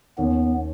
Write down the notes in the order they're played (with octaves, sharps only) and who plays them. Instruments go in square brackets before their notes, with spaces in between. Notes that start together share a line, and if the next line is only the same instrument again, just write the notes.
[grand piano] D#2 D#3 A#3 C#4 [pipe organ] B3